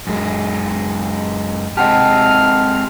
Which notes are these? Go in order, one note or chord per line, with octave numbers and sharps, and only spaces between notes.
F#2 G#3
G#3 C4 G4 D#5 F#5 A5 F6